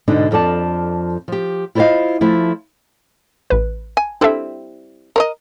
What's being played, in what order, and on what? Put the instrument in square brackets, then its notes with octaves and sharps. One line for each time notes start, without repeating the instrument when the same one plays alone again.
[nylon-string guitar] G#2 B2 D3 D4 D#4
F2 F3 A4 D5 A5
F3 G4
E4 F4 C5 C#5 D#5 F5
F3 A3 E4
[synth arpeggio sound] A1 B4
[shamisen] G#5
[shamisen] G3 C4 E4 [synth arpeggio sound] D4 A4 E5
[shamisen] A#4 C#5 D#5